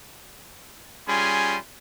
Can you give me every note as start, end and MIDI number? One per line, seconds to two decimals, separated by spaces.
1.08 1.57 55
1.08 1.57 61
1.08 1.57 65
1.08 1.57 68
1.08 1.57 80
1.08 1.57 84